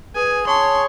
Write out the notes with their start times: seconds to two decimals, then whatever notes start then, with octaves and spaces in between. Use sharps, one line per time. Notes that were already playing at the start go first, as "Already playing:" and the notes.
0.16 G#4 B4 G#5
0.47 C#5 A5 C6